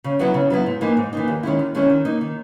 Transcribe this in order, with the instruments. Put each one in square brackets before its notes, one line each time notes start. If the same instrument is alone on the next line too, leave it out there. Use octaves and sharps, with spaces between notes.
[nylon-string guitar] C#3
F#3 B3 E4
C#3
F#3 B3 E4
G#2
E3 A#3 D#4
G#2
E3 A#3 D#4
D#2
D#3 G#3 C#4 E4
D#2
D#3 G#3 C#4 E4
D#3
A#3 D#4
D#3